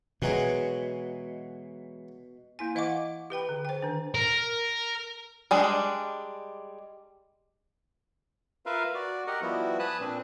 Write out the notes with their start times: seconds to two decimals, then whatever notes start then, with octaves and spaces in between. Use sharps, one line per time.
0.22 B2 E3 F#3 G#3
2.59 A#3 E4 G#5
2.75 E3 D#5 F5 F#5 C#6 D6
3.30 G4 B4 G5 B5
3.49 D3
3.65 C5 G5
3.83 D#3 D4
4.15 A#4
5.51 G3 G#3 D4
8.66 F4 A#4 B4 E5 F5
8.94 F#4 D5
9.27 G4 A#4 D#5 F#5
9.42 F3 G3 B3 E4 F#4
9.79 B4 G#5 A5 B5 D#6 F#6
10.00 A#2 C4 D4